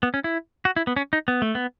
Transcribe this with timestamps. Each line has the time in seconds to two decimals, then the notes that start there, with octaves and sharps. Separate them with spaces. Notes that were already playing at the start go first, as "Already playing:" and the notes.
0.03 B3
0.14 C#4
0.24 E4
0.65 F#4
0.76 E4
0.87 B3
0.96 C#4
1.13 D#4
1.28 B3
1.42 A3
1.55 B3